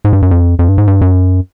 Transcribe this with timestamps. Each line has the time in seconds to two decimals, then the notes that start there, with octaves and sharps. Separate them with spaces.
0.05 G#2
0.13 G2
0.22 F#2
0.31 F2
0.59 F2
0.69 G2
0.78 G#2
0.87 G2
1.01 F#2